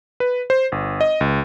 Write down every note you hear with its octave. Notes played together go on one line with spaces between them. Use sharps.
B4
C5
G1
D#5
C#2